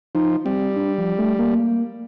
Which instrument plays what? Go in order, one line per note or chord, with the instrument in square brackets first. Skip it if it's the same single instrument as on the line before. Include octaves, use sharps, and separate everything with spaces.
[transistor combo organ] F3 [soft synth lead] D#4
[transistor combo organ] G3 [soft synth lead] C4
[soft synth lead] D4
F3
A3
A#3